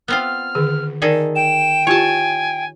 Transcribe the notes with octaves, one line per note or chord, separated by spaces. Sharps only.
B3 C4 F4 F6
D3 D#3 G#4
D#3 G#4 A4 D5
G5 E7
E4 F4 G4 C#5 G#5 A5